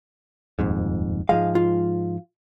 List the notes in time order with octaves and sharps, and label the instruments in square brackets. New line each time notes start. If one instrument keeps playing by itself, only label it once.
[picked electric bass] D#1 F2 G#2
[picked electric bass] G#2 F3 G#3 [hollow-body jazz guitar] F5
[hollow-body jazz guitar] F4